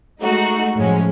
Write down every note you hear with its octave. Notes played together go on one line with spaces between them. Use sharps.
G#3 A3 D#4 F#4
F#2 A2 F3 G#3 C#4